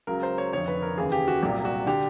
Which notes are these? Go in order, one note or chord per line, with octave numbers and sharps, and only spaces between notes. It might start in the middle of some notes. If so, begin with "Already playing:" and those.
C#2 C#3 F#3 A#4
C5
C#5
F1 F2 D3 C#5
B4
A#4
D#2 C#3 E3 G#4
G4
F#4
C2 A#2 F#3 G4
F#4
D3 G4